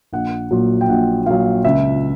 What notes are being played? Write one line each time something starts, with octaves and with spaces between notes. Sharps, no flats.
A#1 F#5
A#2 F#3
G5
A#1 F#5
A#2 F#3 F5
C#2 E5